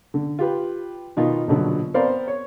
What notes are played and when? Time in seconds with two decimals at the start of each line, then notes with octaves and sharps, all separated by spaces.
0.14 D3
0.39 F4 G4 B4
1.17 B2 D#3 D#4 F4
1.48 A#1 B2 D3 F#3
1.94 B3 C4 A#4 C5 D5 F5
2.28 C#5